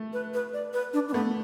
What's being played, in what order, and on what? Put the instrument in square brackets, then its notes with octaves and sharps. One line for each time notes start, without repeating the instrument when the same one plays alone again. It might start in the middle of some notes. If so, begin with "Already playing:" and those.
Already playing: [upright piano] A3
[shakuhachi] B4
B4
D5
B4
D4
D4
[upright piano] A3 [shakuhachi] B3